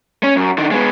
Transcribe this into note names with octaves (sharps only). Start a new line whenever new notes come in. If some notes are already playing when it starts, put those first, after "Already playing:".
C#4
F#2
D3 D#3
G#3 B3